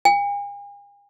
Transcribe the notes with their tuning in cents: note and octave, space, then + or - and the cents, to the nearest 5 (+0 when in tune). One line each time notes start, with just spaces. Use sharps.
G#5 -45